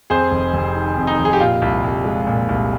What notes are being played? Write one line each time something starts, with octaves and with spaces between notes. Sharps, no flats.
F2 G#4 C5
F1
F1
D#3
F2
D#4
F1
G#4
G4
A#2 F4
C2
C2
G#3
A#2
C2